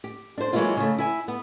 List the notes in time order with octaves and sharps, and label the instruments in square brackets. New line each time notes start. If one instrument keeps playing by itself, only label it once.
[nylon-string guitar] G4
D4 C5
E3 F#3 G#3 A#3 E4 F4
C#3 A3
E4 G#5
B3